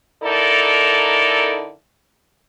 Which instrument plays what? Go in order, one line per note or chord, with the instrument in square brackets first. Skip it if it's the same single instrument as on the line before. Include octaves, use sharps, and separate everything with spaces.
[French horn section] D3 D#4 E4 A4 A#4 D5